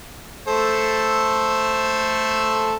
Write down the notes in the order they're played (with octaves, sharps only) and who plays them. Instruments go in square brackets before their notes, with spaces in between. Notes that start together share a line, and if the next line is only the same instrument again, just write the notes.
[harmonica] A3 A4 C5